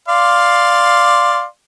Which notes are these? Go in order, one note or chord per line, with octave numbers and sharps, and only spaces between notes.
D5 F5 C6